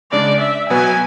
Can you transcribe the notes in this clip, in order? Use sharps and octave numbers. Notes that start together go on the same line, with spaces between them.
C#3 G#3 D4 D5
E5
B2 F#3 B3 F#4 B4 G#5